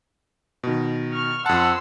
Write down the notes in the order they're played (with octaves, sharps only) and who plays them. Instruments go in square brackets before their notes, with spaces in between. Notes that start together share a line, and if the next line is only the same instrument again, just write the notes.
[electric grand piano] B2 D#3
[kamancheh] C#6 F6
[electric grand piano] F2 A5 [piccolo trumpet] F#5 [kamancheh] C6 E6